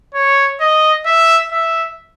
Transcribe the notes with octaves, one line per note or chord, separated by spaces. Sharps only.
C#5
D#5
E5
E5